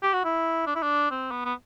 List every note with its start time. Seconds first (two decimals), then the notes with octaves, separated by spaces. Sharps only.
0.03 G4
0.13 F#4
0.24 E4
0.67 D4
0.75 E4
0.82 D4
1.11 C4
1.31 B3
1.45 B3